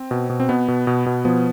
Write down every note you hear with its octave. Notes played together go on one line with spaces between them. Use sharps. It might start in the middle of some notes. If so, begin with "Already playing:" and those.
Already playing: C4
B2
B2
C4
B2 B3
B2
B2
B2
F3 B3